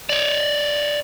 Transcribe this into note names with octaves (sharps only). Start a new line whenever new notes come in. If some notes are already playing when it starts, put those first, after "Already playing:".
C#5 D5